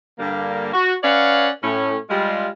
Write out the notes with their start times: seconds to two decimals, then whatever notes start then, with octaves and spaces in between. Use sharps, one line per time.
0.19 G2 D3 G3 A#3
0.74 F#4
1.03 C#4 B4 C#5 D5 F5 F#5
1.64 A2 C#4
2.10 G3 G#3 F4